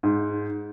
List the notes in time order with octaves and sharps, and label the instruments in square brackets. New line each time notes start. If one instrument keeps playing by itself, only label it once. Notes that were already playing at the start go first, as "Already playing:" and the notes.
[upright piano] G#2